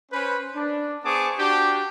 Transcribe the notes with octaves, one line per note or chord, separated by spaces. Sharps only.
C#4 B4 C5
D4
B3 G#4 C5 A5 C#6 D6
D4 F#4 G4